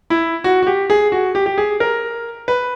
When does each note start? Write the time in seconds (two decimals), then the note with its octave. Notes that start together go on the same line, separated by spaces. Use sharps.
0.10 E4
0.44 F#4
0.63 F#4
0.67 G4
0.90 G#4
1.12 F#4
1.35 G4
1.46 G4
1.58 G#4
1.80 A#4
2.48 B4